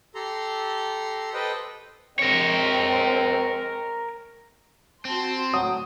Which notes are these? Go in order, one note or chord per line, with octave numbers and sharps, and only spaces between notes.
G4 A4 A#5 C6
A4 B4 C5 D#5 G5
G#3 C4 A#4 C#5
C4 F#4 A5 C6
D2 A2 F#3 D#6